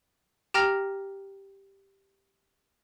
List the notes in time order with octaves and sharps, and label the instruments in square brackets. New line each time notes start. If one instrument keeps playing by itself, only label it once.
[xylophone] G4 G5 A#5 F6 A#6 F7